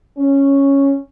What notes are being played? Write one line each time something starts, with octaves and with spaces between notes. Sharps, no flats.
C#4